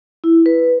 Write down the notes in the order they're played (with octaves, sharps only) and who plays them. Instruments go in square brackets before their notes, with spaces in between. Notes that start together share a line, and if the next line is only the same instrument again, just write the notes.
[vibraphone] E4
B4